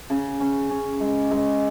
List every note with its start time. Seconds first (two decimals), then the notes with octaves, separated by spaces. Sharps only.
0.10 C#3
0.40 C#4
0.70 C#4
1.00 G#3
1.31 G#3